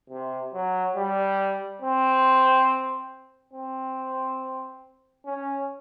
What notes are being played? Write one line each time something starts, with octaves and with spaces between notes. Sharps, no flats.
C3
F#3
G3
C4
C4
C#4